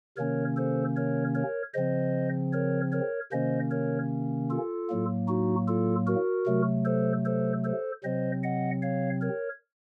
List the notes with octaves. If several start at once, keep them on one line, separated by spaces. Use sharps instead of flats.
C3 D#3 A#3 C#4 A#4 C#5
A4 C5
A#4 C#5
A#4 C#5
C#3 F3 C4 C5 D#5
A#4 C#5
A#4 C#5
C3 D#3 A#3 C#4 C5 D#5
A#4 C#5
F4 A4
A2 F#3 A#3
D#4 F#4
F4 A4
F#4 A#4
C3 F#3 A3
A4 C5
A4 C5
A4 C5
C3 F#3 C4 C5 D#5
D#5 F#5
C#5 F5
A#4 C#5